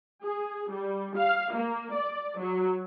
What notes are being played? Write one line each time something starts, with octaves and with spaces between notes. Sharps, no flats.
G#4
G3
F5
A#3
D5
F#3